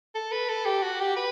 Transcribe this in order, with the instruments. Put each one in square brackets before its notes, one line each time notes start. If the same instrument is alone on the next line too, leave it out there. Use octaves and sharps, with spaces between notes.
[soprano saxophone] A4
B4
A4
G4
F#4
G4
B4